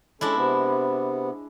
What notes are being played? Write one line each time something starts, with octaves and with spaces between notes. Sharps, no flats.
G#3 C#4 D4 E4 A4
C3 B3